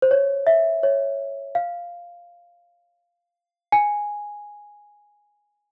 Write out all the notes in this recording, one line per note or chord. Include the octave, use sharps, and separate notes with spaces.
C5
C#5
E5
C#5
F5
G#5